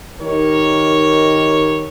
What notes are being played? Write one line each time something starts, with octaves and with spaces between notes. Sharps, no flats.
D#3 G4 A#4 C#5